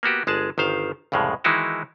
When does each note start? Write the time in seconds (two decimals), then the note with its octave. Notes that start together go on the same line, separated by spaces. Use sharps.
0.03 A#3 B3 F#4 G4
0.27 G1 G#3 G#4 A5
0.58 G1 D#3 C5 F5
1.12 C2 F2 A2 C#3 G#3
1.44 D#3 E3 G#3 D#4 E4 F#4